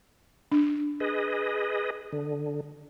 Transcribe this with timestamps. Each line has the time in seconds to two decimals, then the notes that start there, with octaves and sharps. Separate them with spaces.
0.52 D4
1.00 G#4 B4 D#5
2.13 D3